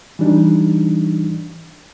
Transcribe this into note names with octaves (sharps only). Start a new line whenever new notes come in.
E3 G3 D4 D#4